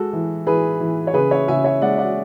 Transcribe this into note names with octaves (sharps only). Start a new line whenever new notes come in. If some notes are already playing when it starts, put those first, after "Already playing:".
Already playing: G#3 F#4 A4
E3
E3 G#4 B4
E3
C#5
C#3 G#4 B4
C#5 E5
C#3 E5 G#5
C#5 E5
G#3 D5 F#5
D5 F#5